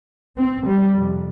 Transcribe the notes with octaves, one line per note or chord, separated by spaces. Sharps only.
C4
G3
F2 C3